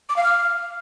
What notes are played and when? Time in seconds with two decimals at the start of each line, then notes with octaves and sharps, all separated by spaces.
0.09 D6
0.17 F5
0.24 F6